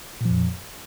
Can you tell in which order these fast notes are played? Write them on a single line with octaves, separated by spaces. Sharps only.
A#2 F3 F2